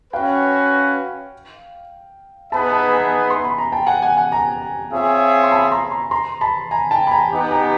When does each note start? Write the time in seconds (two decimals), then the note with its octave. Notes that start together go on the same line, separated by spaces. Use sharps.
0.13 C#4 F#4 B4 F5 G5
2.52 B3 D#4 G#4 B4 E5 A5 B5
2.73 A5 B5
2.92 G#5 A#5
3.30 C6
3.45 B5
3.58 A#5
3.72 G5 A5
3.87 F#5 G#5
4.02 F#5 G#5
4.17 F#5 G#5
4.32 G#5 A#5
4.92 C4 F4 G#4 C#5 E5
5.44 C6
5.51 A5 B5
5.71 A#5 C6
5.91 A#5 C6
6.11 A#5 C6
6.41 A5 B5
6.71 G#5 A#5
6.91 G5 A5
7.07 B5
7.11 G#5 A#5
7.31 B3 D#4 G4
7.51 G#5 A#5